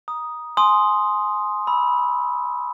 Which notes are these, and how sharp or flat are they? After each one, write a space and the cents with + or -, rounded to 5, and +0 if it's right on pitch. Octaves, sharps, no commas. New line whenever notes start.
A#5 +30 D#6 +0
G#5 +20 C6 +0 D#6 +0
B5 -15 E6 -20